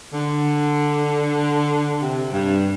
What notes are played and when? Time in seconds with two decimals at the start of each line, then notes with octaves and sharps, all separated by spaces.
0.13 D3
2.01 C3
2.33 G2